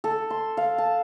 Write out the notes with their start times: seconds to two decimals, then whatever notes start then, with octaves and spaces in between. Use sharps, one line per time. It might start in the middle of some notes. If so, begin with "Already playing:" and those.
0.04 A4
0.30 C6
0.57 F5
0.78 A5